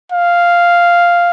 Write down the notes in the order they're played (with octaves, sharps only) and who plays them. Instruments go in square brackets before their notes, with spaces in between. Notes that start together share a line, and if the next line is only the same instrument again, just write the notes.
[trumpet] F5